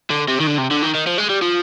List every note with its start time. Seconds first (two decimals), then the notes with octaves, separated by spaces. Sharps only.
0.10 D3
0.28 C3
0.40 D#3
0.47 D3
0.58 C3
0.71 D3
0.82 D#3
0.95 D#3
1.07 F3
1.18 G#3
1.30 G3
1.42 F3